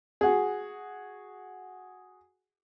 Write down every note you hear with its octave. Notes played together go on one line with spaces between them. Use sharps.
F#4 G#4